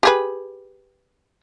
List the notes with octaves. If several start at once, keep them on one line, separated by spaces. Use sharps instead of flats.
G4 G#4 B4